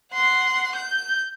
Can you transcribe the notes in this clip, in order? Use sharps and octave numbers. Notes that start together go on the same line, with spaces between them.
F#5 C6
G6